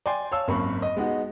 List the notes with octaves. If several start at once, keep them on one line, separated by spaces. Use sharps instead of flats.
D5 G5 G#5 C6
C#5 F5 A5 E6
G#1 F#2 A#3 A#4 B5 C#6
D#5
G#3 B3 D#4 F#4